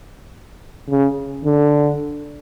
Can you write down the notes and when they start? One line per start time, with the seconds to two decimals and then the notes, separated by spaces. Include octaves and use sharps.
0.89 C#3
1.45 D3